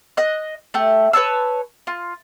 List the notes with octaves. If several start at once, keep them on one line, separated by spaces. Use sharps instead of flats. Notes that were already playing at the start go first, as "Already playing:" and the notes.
D#5 F#6
A3 G4
B4 C#5 A5 E6
F4